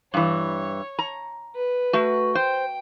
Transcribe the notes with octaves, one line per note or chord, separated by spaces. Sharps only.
G2 E3 C#5
A#5
B4
A3 F#4
C5 G5